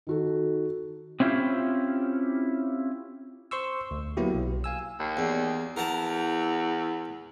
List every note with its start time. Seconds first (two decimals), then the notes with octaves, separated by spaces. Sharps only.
0.07 D#3 F#4 A4
1.20 C4 C#4 E4 F4 G4
3.51 C5 C6 C#6 E6
3.91 D2
4.17 F#3 A#3 B3 E4 F#4 G4
4.34 B1
4.64 F5 G#5 E6
4.99 D#2
5.17 E2
5.76 E2 A#4 F#5 A5